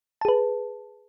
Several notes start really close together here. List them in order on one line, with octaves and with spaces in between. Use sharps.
A5 G#4 B4